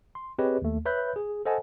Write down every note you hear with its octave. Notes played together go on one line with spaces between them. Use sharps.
C6
C4 G4 G#4 B4 C#5 D#5
D#2 A3
B4 C#5 E5 B5 F#6 G6
G#4
A4 C5 D#5 F#5 G#5 A5